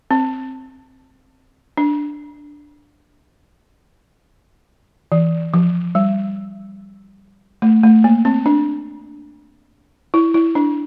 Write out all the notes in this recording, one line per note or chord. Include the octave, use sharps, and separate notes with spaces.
C4
D4
E3
F3
G3
A3
A3
A#3
C4
D4
E4
E4
D4